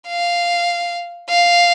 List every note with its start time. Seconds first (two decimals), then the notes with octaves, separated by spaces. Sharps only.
0.08 F5
1.30 F5